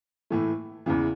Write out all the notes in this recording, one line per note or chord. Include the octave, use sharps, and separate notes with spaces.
A2 E3 A3
E2 C#3 E3